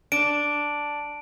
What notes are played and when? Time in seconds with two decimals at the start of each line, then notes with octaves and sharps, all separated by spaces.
0.12 D4 D7